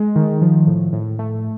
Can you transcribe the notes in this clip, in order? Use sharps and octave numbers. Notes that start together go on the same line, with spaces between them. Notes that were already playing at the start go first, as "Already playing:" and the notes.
Already playing: G#3
D#3
F3
A2
A2
A3